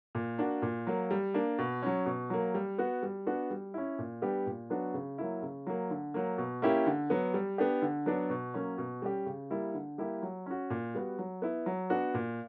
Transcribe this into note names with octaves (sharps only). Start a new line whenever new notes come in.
A#2
A#3 D4 F#4
A#2
F#3 A#3
G3
A#3 D4
B2
F#3 C#4
B2
F#3 A#3
G3
B3 F#4
G3
B3 D4 F#4
G3
C#4 E4
A#2
G3 B3 D4 G4
A#2
F#3 B3 D4 F#4
C#3
F#3 A#3 E4
C#3
F#3 A#3
D3
F#3 A#3
B2
A#3 C#4 E4 G4
D3
F#3 B3
G3
B3 D4 G4
D3
F#3 B3 D4
B2
F#3 A#3 C#4
B2
G3 C#4 G4
C#3
G3 A#3 E4
D3
G3 A#3 E4 G4
F#3
C#4 F#4
A#2
G3 B3 F#4
F#3
B3 E4
F#3
B3 D4 F#4
A#2